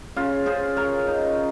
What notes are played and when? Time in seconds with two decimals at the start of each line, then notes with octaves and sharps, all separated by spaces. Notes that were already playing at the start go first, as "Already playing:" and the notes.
0.16 C#3 F4
0.46 C#3 G#4 C5
0.76 C#3 A#4 C#5
1.07 D#4